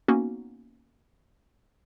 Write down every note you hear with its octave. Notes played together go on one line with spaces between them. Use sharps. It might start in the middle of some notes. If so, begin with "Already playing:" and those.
A#3 B3 C#4 D#4 F#4